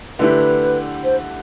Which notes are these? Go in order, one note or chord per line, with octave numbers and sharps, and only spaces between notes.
D3 A3 E4 G4 B4
C5